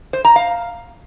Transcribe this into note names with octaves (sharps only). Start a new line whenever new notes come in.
C5
A#5
F5